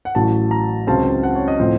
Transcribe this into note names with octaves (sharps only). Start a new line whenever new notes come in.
F#5
A1 A2 F#3 A5
A#5
C#2 C#3 F#3 C4 A5
F#5
C#5
D#5
A2 F3 C4